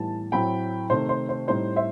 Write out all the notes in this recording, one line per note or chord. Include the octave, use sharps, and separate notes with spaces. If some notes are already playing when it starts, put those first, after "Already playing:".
Already playing: A2 E3 G3 B3 D#4 A5
A2 F#3 A3 C4 G5 B5
C3 D#3 A3 C5
C5
C5
A2 G3 C4 D#4 C5
C5 E5